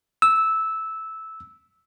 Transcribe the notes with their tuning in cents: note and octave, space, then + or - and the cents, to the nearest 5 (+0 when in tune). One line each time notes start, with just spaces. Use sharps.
E6 -10